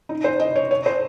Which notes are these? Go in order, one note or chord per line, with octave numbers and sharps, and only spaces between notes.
D#4
C5
D#5
C#5
C#5
C5